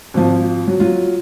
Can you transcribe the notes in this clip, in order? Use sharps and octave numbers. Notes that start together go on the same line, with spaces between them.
G#1 F3
F#3
F#3 F4